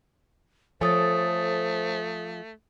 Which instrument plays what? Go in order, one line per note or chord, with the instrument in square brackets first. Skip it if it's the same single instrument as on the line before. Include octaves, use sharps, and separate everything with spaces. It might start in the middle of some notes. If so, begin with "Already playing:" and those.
[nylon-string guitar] F3 A4 C#5 [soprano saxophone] A3 [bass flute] C5 [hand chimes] G#5 D#6 A6